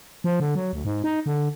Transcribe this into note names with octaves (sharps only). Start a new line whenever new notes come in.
F3
D3
F#3
D2
G#2
D#4
D3